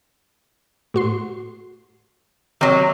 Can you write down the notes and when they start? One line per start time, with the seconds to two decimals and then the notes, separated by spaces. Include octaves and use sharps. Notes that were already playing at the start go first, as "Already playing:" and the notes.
0.94 A2 F#4 C6
2.61 C3 D#3 F#3